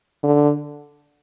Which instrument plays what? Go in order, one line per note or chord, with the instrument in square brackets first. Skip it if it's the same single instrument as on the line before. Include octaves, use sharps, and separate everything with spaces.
[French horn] D3